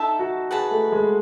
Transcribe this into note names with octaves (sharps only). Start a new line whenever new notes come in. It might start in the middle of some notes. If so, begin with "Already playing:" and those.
Already playing: D#4 A4 E5 A5
F#4
G#4 B4 F#5 A5
A3
G#3